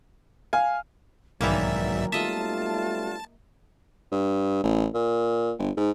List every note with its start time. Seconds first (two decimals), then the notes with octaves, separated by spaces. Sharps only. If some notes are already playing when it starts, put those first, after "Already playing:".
0.53 F5 G#5
1.41 B1 G#2 D#3 E3 F#3 A#3 D5 E5
2.12 B1 G3 A3 F4 D#5 E5 A5
4.12 G2
4.63 A1
4.94 A#2
5.58 G1
5.77 G#2